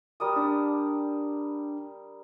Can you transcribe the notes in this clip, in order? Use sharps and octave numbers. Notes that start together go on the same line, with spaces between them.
G3 A#4 D#6
D4